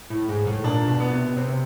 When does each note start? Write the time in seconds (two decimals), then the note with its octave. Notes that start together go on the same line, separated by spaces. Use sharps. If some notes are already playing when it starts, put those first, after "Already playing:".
0.10 A2
0.29 G#2
0.47 A2
0.64 A#2 D4
0.88 B2
1.00 B3
1.12 C3
1.36 C3 C4